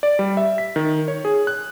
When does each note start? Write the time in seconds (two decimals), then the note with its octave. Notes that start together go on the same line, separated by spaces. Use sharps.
0.03 D5
0.19 G3
0.37 E5
0.58 B6
0.76 D#3
1.08 C#5
1.25 G#4
1.47 F#6